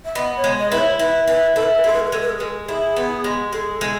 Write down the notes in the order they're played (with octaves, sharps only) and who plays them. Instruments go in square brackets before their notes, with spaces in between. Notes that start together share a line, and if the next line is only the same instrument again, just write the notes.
[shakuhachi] E5
[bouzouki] B3 [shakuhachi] D#5
[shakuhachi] C#5
[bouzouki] G#3
[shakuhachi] D#5
[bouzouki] E4 [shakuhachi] B4
[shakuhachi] C#5
[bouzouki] E4 [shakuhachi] B4
[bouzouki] E4 [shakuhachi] B4
[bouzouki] E4 [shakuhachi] A4
[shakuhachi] B4
A4
B4
[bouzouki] G#3 [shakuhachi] A4
[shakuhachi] B4
A4
B4
[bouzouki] G#3 [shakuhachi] A4
[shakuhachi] B4
A4
B4
[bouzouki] G#3 [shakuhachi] A4
[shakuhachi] A4
[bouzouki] E4 [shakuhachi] G#4
[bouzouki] B3
G#3
[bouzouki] G#3 [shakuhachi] A4
[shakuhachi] G#4
A4
[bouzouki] G#3